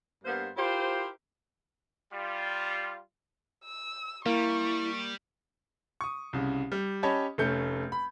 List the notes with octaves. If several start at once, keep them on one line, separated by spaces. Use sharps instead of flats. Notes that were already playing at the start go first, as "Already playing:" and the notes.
G2 A#3 B3 C5 F5
E4 F4 G4 A#4 C5
G3 F4
E6
G3 A#3 E4 C#6
C#6 D#6
C2 C#3
G3
C#4 G4 C#5 D#5 A5 B5
F1 A3 C#4 G6 C#7
B5